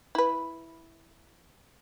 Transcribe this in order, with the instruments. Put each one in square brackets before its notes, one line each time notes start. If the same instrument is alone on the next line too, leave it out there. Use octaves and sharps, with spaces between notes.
[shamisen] E4 B4